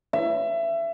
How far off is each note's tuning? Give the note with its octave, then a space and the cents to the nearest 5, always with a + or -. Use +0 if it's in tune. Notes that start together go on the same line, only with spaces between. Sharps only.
E5 +25